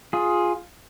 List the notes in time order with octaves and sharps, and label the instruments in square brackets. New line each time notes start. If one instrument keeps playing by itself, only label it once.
[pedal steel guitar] F4 G#4